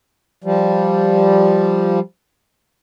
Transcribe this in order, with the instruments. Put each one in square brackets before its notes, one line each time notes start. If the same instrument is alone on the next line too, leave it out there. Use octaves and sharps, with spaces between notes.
[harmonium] F3 G3